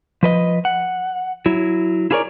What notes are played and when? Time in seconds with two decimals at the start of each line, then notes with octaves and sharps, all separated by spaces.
0.23 F3 B4 D#5
0.65 F#5
1.46 F#3 E4
2.11 E4 F4 G#4 A#4 C#5 D5